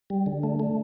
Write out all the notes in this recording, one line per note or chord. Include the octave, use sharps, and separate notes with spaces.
G3
D3
A3
A3